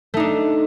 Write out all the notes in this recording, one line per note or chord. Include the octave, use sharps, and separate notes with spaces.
A3 D4 D#4